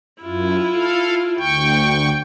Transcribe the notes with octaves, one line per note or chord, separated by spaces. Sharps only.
F#2 E4 F4
A4 F5
D2 G5 C#6